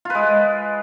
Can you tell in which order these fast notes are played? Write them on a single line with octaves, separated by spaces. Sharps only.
F4 B4 G#3